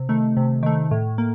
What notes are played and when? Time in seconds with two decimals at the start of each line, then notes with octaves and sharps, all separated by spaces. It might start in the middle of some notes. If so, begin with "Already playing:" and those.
Already playing: C3
0.09 D#3 A3
0.37 C3
0.63 D#3 A3
0.91 A2
1.18 A#3